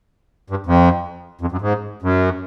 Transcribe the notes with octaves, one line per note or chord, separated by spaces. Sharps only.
G2
F2
F2
F#2
G#2
F#2